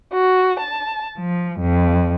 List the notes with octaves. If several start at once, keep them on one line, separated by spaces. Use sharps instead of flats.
F#4
A5
F3
F2